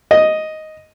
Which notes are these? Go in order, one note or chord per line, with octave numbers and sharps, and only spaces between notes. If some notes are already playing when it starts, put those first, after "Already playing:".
D#5